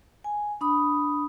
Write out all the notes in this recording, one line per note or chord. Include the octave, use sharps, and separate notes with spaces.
G#5
D4 B5 D#6